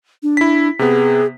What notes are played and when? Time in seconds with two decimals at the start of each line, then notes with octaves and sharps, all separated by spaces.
0.23 D4
0.37 E4 B6
0.79 C3 B3 G#4